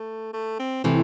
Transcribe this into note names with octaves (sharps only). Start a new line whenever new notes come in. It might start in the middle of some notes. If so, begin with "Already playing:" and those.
Already playing: A3
A3
C4
C3 E3 A3